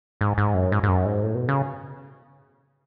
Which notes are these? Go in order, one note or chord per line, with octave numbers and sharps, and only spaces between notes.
G#2
G#2
F#2
G#2
G#2
F#2
G#2
A2
B2
C#3